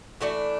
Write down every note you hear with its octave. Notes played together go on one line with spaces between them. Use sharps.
E3 A3 D4 F#4